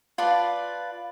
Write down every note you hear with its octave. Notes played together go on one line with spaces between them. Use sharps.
F4 B4 D5 A5